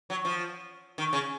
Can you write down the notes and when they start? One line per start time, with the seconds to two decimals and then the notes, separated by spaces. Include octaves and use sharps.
0.10 F#3
0.25 F3
0.98 D#3
1.13 C#3